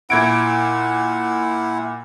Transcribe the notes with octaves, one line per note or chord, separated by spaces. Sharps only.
A#2 E4 F#5 G#6 D7